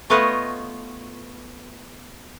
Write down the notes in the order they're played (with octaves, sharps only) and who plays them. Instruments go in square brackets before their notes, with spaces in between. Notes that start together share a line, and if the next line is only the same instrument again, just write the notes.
[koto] A3 B3 F4 B4 C#5 D#5